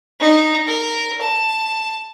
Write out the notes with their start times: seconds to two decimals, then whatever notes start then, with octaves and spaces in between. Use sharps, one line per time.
0.20 D#4
0.67 A#4
1.21 A5